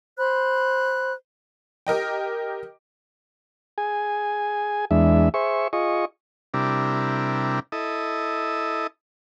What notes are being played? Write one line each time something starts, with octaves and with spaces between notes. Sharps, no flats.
C5 B5 F#6
G4 A#4 D#5 G5
G#4 G#5
E2 G#3 D4 E5
G#4 C5 E5 C#6
F4 G#4 D#5 C#6
C3 G3 D4 E4 A#4
E4 A4 D#5